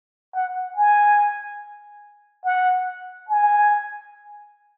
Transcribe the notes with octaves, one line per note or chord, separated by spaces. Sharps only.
F#5
G#5
F#5
G#5